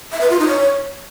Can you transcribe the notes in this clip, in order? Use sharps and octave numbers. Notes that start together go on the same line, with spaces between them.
E5
B4
F4
D#4
C#5